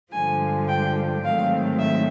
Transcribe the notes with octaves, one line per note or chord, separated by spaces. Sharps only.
G2 D3 F3 G#3 G#5
G5
G#2 D#3 F#3 A3 C4 F5
E5